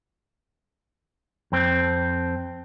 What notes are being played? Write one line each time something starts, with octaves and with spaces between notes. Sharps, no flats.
F2 C4